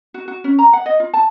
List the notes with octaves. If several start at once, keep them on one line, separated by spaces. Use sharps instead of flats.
F#4
F#4
C#4
A#5
F#5
D#5
F4
A5